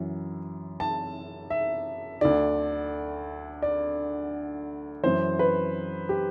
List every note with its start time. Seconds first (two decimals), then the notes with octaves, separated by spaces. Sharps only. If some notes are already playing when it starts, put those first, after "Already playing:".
Already playing: F#2 E3
0.80 A5
1.50 E5
2.21 D2 D3 D5
3.62 D5
5.03 F#2 E3 C5
5.39 B4
6.09 G4